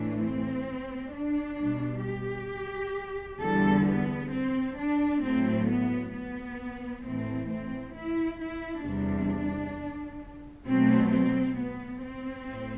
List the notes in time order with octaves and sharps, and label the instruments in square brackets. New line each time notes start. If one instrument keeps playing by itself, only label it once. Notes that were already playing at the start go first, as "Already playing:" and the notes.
Already playing: [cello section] A2 E3 A3 D4
C4
D4
B2 G3
G4
E2 D3 G3 A4
B3
C4
D4
A2 F#3 A3 C4
B3
B3
A2 E3 A3 C4
C4
E4
E4
E2 C3 G3 D4
B2 F#3 A3 C4
C4
B3
C4
A2